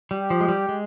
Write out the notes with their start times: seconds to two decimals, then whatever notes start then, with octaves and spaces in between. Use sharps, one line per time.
0.11 G3
0.20 G4
0.30 F3
0.41 G#3
0.48 G3
0.69 G#3